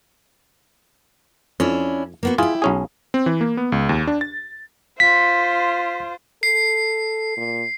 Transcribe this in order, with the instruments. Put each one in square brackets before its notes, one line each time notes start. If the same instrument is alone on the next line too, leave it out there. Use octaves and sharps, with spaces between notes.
[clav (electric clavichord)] F2 [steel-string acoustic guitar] C#4 D4 E4
[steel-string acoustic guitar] A#3 B3 F#4
[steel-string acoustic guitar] E4 G4 [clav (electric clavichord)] F4 G#4
[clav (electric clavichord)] B1 C#4 G#4
[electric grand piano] C4
E3
A#3
B3
C#2
D#2
D4
A6
[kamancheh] F4 C5 [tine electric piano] B6
[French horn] A4 [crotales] C7
[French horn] A#2